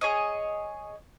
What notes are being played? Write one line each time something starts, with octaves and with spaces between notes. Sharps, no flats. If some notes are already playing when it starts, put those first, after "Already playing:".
G#4 C#5 D#5